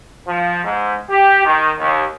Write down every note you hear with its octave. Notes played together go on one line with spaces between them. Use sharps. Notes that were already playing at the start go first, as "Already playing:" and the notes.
F3
G#2
G4
D#3
D#2